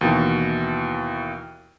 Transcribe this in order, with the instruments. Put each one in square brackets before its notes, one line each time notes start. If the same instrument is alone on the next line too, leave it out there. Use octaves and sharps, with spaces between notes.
[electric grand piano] D#2 B2 E3